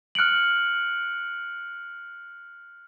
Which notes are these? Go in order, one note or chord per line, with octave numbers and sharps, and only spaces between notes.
F6 F#6 C#7 D7 F#7